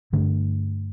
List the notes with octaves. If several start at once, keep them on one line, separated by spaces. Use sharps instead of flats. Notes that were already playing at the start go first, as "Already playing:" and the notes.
G2 D3 A3 D4